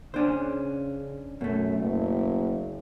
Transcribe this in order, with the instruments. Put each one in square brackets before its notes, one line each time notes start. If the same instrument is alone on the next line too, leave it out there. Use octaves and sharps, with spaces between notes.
[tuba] C#3 [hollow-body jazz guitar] C#4 D4 C5
[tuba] F#2 [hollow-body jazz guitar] B2 A3
[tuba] F#1